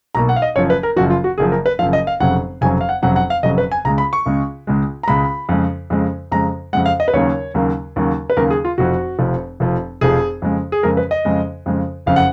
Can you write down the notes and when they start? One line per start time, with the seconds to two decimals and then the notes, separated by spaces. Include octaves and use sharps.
0.15 B1 B2 A#3 A#5
0.29 F#5
0.36 F5
0.42 D#5
0.56 F#1 F#2 F3 C#5
0.70 B4
0.83 A#4
0.96 F#1 F#2 F3 F#4
1.10 F4
1.24 F#4
1.38 F#1 F#2 F3 G#4
1.52 A#4
1.66 B4
1.79 F#1 F#2 F3 F5
1.93 D#5
2.07 F5
2.20 F1 F2 C#3 F#3 F#5
2.61 F1 F2 C#3 F#3 G#5
2.81 F5
2.89 F#5
3.02 F1 F2 C#3 F#3 F#5
3.16 F#5
3.30 F5
3.43 F1 F2 C#3 F#3 D#5
3.58 B4
3.72 G#5
3.85 C#2 C#3 G#3 A#5
3.98 B5
4.13 C#6
4.26 C#2 C#3 G#3
4.67 C#2 C#3 G#3
5.03 A#5
5.07 C#2 C#3 G#3 B5
5.49 F2 C#3 G#3
5.90 F2 C#3 G#3
6.32 F2 C#3 G#3 A#5
6.73 F2 C#3 G#3 F#5
6.86 F5
7.00 D#5
7.08 B4
7.13 D#2 C#3 F#3 A#3 C#5
7.54 D#2 C#3 F#3 A#3
7.96 D#2 C#3 F#3 A#3
8.30 B4
8.37 D#2 C#3 F#3 A#3 A#4
8.50 G#4
8.65 F4
8.78 F1 F2 F3 F#4
9.19 F1 F2 F3
9.60 F1 F2 F3
10.01 F1 F2 F3 G#4
10.42 F2 C#3 G#3
10.72 G#4
10.83 F2 C#3 G#3 A#4
10.97 B4
11.11 D#5
11.25 F2 C#3 G#3
11.66 F2 C#3 G#3
12.06 F#1 F2 C#3 F5
12.16 F#5